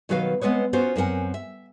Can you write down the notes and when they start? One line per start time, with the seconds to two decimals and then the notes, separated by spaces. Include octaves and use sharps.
0.09 B2 D#3 F#3 F#4 B4 F5
0.41 G#3 B3 C4 B4 C#5
0.73 B3 C#4 F4 F#4 C5
0.96 F#2 C4 A#4 F#5 G#5
1.34 E5